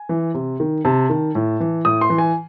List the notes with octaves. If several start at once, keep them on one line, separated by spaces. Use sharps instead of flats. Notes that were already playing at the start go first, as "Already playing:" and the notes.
Already playing: G#5
E3
C3
D#3
C3 A5
D#3
A2
E3
A2 D#6
C6
E3
G#5